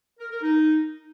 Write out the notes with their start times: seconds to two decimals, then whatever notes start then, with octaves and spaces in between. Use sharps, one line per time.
0.19 A#4
0.31 A#4
0.42 D#4